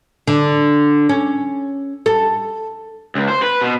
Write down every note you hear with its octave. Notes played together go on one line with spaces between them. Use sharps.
D3
C#4
A4
C#2
C5
B4
B2